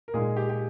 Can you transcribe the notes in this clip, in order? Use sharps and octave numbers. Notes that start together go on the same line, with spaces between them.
A#4
A#2 G#3 D#4 G#4
G4
G4